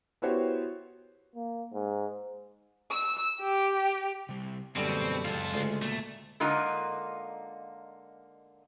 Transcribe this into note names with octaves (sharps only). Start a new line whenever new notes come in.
B3 E4 F#4 G4 C5 C#5
A#3
G#2
E6
G4
C3 G3
A1 F#2 B2 D3 G3 G#3 C4
C#2 F4 A4
D2 G#3
A#2 A3 A#3
D3 G#3 A#3 D#4 F4 A#5